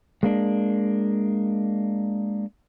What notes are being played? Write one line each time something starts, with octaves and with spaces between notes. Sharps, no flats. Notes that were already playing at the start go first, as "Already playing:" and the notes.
G#3 A#3 D4